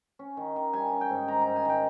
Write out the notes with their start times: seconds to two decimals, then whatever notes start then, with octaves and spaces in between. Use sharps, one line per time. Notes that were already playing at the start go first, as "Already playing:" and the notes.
0.19 C#4
0.37 D#3
0.56 D#3
0.73 G3 G#5
0.92 C#4
1.01 G5
1.10 G#2
1.28 D#3 A#5
1.42 A#5
1.47 G#2
1.56 G#5
1.65 D#3 G5